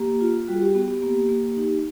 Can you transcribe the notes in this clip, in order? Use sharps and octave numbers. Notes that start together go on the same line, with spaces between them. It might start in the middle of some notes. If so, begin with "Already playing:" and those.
Already playing: A#3 G4
F4
G3 F#4
G#4
G4
B3 F#4
G4
A#3
A#3
D#4